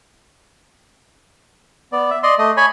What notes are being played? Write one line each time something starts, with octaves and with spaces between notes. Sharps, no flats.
B3 D5
E5
D5 D#5 C6
A3 D#5
C#5 G#5 B5